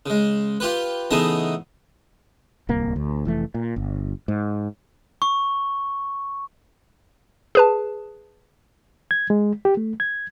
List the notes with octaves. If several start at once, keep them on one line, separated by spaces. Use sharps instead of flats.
C#3 G#3
F4 G4 B4
C#3 E3 A3 B3 D#4 G#4
D1 C2 A#3
D2
F1 E3 A3
A#2
G1
G#2
C#6
G#4 B4 A5
G#6
G#3
G4
A3
G#6